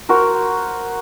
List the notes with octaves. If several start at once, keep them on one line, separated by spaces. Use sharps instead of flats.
F#4 A#4 C5